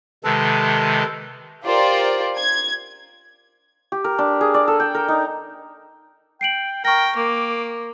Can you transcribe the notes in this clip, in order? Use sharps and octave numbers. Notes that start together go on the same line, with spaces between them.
C3 D#3 G#3 A4 B4 A5
F4 G4 A#4 C5 D5
G#6
G4
A#4
D4
G#4
D5
A4
G5
A#4
D#4
G5 C7 D7 F#7
A#4 G5 C#6 A#6
A#3 D6